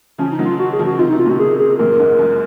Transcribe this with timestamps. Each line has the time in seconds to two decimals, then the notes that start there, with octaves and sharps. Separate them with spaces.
0.18 C#3 F3 C#4
0.32 D#4
0.39 D#3 F#3
0.45 F4
0.59 F#4
0.73 G#4
0.79 C#3 F3
0.86 F#4
0.99 C3 D#3 F4
1.09 D#4
1.12 C3 D#3
1.19 F4
1.26 A#2 C#3 F#4
1.39 G#4
1.59 G#4
1.79 F#2 A#2 A#4
1.99 G#2
2.19 F#2